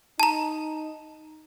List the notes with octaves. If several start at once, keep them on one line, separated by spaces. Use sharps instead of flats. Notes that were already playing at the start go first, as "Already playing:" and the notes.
D#4 A5 A#5